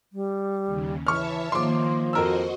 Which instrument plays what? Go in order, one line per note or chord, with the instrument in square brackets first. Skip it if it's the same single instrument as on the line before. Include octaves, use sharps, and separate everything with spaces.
[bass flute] G3
[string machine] D#2 C#3
[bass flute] E3 [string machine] C#5 E5 A5 [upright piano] C#6 F6
[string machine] D#3 A#3 [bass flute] F3 [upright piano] C6 D6
[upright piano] F2 A#4 E6 [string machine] F#4 C5 D#5